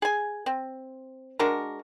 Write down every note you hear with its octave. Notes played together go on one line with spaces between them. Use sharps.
G#4 G#5
C4
G#3 D4 F#4 A#4